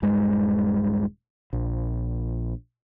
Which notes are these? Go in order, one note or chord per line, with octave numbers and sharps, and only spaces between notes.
D#1 G2 G#3
A#1